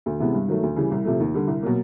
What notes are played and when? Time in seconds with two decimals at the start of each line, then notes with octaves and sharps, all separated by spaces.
0.06 D2
0.20 C3 E3 G#3 B3
0.33 G2
0.48 D#3 F#3 A3
0.63 D2
0.76 C#3 E3 G3
0.91 C2
1.05 C3 F3 A3
1.20 D#2
1.34 D3 G3
1.48 C2
1.63 B2 F#3 A#3